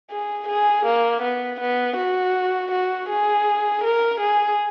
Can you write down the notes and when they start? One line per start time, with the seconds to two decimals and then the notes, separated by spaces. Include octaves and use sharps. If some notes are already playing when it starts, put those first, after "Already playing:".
0.11 G#4
0.48 G#4
0.86 A#3
1.23 B3
1.60 B3
1.97 F#4
2.72 F#4
3.09 G#4
3.84 A#4
4.20 G#4